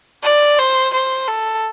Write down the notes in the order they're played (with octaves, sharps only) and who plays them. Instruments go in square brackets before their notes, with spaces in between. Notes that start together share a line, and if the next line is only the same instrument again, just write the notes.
[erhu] D5
C5
C5
A4